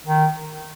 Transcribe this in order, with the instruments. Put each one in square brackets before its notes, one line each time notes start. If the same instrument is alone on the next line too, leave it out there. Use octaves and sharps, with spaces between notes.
[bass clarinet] D#3